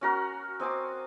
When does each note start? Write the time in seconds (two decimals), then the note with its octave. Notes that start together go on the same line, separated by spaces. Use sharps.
0.01 C#4 F#4 A#4 F#5
0.60 C4 D#5 G#5 D6